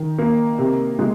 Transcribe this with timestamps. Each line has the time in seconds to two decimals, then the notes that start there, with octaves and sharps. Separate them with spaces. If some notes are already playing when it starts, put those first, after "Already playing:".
Already playing: D#3
0.19 A#3
0.58 C3
0.99 G#3